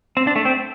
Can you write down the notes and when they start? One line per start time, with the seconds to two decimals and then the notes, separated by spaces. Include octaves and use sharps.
0.17 C4
0.27 D4
0.36 A3
0.45 C4